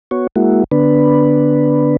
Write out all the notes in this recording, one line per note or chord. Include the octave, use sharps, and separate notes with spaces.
B3 F#4 C#5
G#3 A#3 E4 F#4
D3 B3 D4 B4